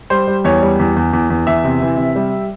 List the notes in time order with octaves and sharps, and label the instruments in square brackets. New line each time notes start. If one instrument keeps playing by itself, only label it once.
[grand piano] G3 C5
G3
E2 C#5
G3
E2
E2
E2
E2
E2 E5
C3
E3
C3
G3